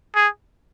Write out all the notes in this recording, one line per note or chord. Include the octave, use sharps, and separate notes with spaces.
G#4